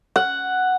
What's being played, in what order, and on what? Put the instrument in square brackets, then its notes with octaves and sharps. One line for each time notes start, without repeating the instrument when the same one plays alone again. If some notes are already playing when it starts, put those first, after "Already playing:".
[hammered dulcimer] F#5